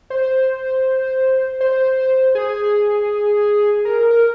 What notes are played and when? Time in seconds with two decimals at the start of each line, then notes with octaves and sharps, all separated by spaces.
0.10 C5
1.61 C5
2.35 G#4
3.85 A#4
4.11 A#4